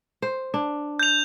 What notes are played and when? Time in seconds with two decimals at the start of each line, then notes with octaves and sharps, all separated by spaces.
0.22 C5
0.54 D4
0.99 G6 F7